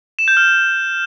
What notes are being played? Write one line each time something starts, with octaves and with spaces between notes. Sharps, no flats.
E7
G6
F6